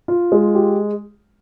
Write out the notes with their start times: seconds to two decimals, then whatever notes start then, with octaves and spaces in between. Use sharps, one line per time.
0.08 F4
0.32 G#3
0.55 G4